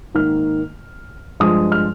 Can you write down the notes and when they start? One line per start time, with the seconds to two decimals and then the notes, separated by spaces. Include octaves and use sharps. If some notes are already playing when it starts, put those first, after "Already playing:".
0.15 G#2 D#3 A#3 F6
1.40 G2 F3 G#3 D#6
1.72 F6